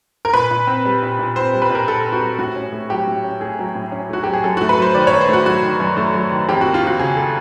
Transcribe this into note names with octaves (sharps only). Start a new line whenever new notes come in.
A#4
A#2 B4
A#2
C4
G3
A#2
A#2
C4 C5
G3
B4
A#2 A#4
A#2 A4
C4
F#4
G3
A2 F#4
C#4
A3
F#3 G4
A2
C#4
A3 G#4
F#3
A2
C#4
A3 F#4
F#3 G4
G#4
F#2 A4
F#4
A3
B4
F#3 C5
D#3 D5
C#5
F#2
C5
A3 F#4
F#3 F#4
D#3
F#2
A3
F#3
D#3
F2 G4
F#4
A#3
F4
F3 F#4
C#3 G#4
A4